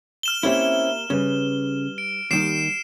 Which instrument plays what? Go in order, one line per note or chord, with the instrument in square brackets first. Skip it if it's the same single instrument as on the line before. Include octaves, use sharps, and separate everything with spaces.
[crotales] F6 E7 G7
[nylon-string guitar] A#3 G4 E5 [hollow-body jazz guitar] C4 C#4 E4
[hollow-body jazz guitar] C#3 [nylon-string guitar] G3 B4
[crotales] D7
[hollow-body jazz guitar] D#2 D#3 [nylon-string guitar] G3 [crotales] C7 D7 E7